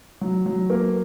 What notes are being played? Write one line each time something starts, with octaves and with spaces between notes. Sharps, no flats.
F#3
F#3
A#3